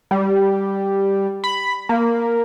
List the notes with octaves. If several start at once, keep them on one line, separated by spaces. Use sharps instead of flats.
G3
B5
A#3